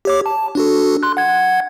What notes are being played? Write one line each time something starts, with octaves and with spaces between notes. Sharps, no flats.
G4 C#5 D6
A5
D4 F#4 A4
C6 F#6
F#5 G#6